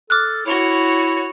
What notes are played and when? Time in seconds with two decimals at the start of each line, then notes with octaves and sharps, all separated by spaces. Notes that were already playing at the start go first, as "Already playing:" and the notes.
0.10 A4 D6 F6 F#6
0.46 E4 F#4 C#5